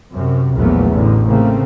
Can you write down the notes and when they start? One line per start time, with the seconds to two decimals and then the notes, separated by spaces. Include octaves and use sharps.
0.13 F#2 C3
0.55 A#1 E2 A#2 F#3 A3 B3
0.91 A1 A2 D3
1.28 C#3 A3 A#3 C4